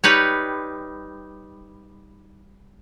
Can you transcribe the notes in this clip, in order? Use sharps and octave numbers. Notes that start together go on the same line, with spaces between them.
G3 D#4 B4 C#5